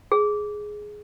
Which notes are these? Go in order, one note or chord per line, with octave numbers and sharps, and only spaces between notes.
G#4